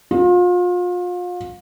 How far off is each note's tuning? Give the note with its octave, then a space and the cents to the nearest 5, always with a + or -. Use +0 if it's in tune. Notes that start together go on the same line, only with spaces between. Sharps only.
F4 +35